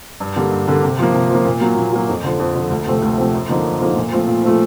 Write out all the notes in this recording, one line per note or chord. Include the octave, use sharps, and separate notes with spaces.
G2
D3 G3 A#3
G2
D3 G3 A#3
C3
F3 A#3
C3
F3 A#3
A#2
F#3 A#3
A#2
F#3 A#3
F2
D3 F3
F2
D3 F3
D2
C3 F3 A3 C4
D2
C3 F3 A3 C4
F#2
D3 F3 A#3 D#4
F#2
D3 F3 A#3 D#4
A#2
F3 A3 C4 F4
A#2
F3 A3 C4 F4